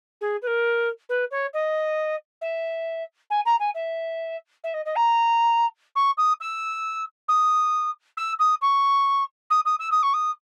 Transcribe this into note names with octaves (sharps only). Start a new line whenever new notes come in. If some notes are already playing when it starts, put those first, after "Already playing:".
G#4
B4
A#4
B4
C#5
D#5
E5
G#5
A#5
G#5
E5
E5
D#5
D#5
A#5
C#6
D#6
E6
D#6
E6
D#6
C#6
D#6
D#6
E6
D#6
C#6
D#6